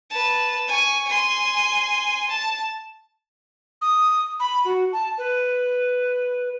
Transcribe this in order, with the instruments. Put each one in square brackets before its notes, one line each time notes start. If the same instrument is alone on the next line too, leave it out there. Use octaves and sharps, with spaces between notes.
[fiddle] B4 A5
G#5 C#6
G#5 C6
A5
[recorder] D#6
B5
F#4
A5
B4